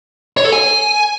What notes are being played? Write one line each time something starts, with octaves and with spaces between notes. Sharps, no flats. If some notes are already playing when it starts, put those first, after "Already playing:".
C#5
A4
G#5